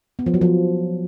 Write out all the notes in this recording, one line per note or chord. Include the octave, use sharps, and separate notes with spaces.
B3
F3
F#3
F3